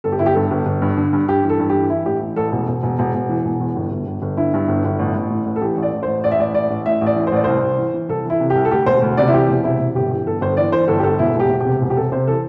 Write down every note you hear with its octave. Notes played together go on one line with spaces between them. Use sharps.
G1 A4
G4
G1 E4
G4
G2 A4
G1
G1
G2
D3
G2
G2 G4
E3
A4
G2
G4
E3
E3 E4
A1 G4
E3
A1 A4
E1
E1
E1
E1
E1
E3
E1
E2
G1
G1
G1
G1
D3 E4
G2
G1
G1
A1
A1
A2
A1
A4
E3 G4
A1
D5
A1
A1 C5
A1 D5
E5
A1 D5
A1 D5
A1
A2 E5
A1
D5
E3
C5
A1 D5
C2 C5
C2
E3
E3
C2 A4
E3 E4
C3
G4
C2
A4
D2 G4
E1 C5
D2
C3 D5
E4
E3 G4
E1
C3 E4
E1
G1 G4
E3 G4
G1 A4
G1 C5
E3 D5
E3 C5
G1 A4
G4
G1 A4
E1 E4
E1 G4
E1
C3 G4
E1
G4
C3 A4
C3 C5
E3 A4